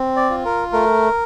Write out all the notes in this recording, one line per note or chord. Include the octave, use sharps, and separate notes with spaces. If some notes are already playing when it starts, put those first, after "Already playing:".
Already playing: C4
D5
F4
A#4
A3 A#4